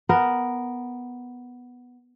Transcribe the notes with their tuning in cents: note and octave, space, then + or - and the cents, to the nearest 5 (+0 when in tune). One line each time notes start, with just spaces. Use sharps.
B3 +0 A#4 +0